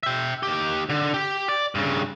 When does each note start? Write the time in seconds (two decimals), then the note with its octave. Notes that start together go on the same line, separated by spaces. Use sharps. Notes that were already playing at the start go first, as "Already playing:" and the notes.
0.03 E5 G5
0.43 D#2 G4
0.89 D3
1.14 G4
1.49 D5
1.75 G2 C#3